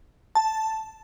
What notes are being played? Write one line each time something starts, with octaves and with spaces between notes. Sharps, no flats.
A5